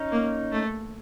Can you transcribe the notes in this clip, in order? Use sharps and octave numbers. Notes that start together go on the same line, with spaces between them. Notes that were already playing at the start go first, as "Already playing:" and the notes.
Already playing: C#4 D#4
A#3
A3